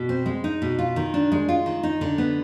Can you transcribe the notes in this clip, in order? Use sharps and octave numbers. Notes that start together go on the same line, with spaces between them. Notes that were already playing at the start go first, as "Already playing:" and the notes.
Already playing: B2
C4
G#3
D#4
B2
F4
D#3
D4
G#3
F4
D#3
D#4
D3
B3